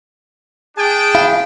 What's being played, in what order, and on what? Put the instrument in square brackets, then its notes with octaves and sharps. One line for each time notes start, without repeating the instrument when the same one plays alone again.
[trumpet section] D4 G5 [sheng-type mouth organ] G#4 A5
[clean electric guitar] E4 F5